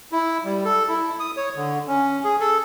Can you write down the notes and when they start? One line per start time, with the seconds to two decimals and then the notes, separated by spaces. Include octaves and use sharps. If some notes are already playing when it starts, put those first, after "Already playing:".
0.12 E4
0.45 G3
0.65 A4
0.89 E4
1.20 D#6
1.37 C#5
1.56 D3
1.88 C#4
2.24 G#4
2.40 A4